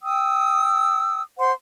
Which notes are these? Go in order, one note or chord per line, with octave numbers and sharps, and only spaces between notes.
G5 D#6 E6
C5 F#5 C6